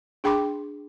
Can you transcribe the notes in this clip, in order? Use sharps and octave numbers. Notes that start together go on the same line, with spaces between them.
D4 G#4 G5 B5 C6 D6